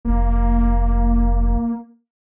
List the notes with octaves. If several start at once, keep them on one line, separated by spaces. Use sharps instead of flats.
F1 A#3